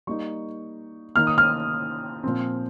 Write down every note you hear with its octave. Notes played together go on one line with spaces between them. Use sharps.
G3 A#3 D#4 C#6
D#3 A#3 D#4 F6
D#6
F6
A#2 F3 C4